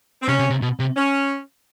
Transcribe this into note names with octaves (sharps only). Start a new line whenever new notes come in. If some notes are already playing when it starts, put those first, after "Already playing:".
C4
C3 C#4
C3
C3
B2
C3
C#4